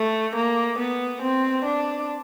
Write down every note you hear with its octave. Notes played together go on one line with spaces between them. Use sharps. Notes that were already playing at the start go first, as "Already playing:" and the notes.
Already playing: A3
A#3
B3
C4
D4